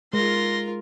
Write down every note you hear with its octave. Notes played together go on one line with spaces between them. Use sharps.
G#3 F4 A#4 C6 A#6